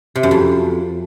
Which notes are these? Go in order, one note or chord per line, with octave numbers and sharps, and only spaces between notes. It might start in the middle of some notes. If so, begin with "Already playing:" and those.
C3
F#2
F2